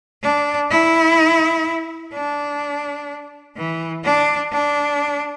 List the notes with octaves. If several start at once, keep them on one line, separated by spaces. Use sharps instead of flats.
D4
E4
D4
E3
D4
D4